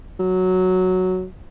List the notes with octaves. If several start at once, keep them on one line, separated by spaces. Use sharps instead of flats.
F#3